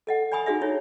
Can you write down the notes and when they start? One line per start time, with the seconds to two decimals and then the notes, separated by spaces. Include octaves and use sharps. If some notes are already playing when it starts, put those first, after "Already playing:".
0.07 A4 D#5 F#5
0.32 D5 G#5 B5 C#6 D#6
0.46 D#4 F#4 G#4 D5 E5
0.61 D#4 E4 C#5